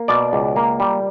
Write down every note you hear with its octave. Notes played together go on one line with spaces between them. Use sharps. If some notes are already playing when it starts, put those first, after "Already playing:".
Already playing: A#3
B2 D5
C#2
A#3
G3